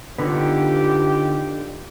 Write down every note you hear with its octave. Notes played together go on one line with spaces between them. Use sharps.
D3 B3 D#4 F4 G4